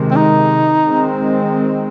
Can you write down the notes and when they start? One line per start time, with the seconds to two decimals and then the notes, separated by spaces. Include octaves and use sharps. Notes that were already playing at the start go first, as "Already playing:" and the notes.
Already playing: C3 D#3 G#3
0.11 C4
0.16 D#4
0.85 D#3 G#3 C4